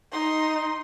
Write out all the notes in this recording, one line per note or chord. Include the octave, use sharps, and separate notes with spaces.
D#4 C6